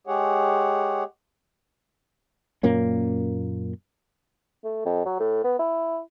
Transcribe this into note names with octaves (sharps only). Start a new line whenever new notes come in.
G#3 G4 G#4 C#5 F#5
F#2 A#2 A#3 C#4
A3
F2
F#3
A2
B3
E4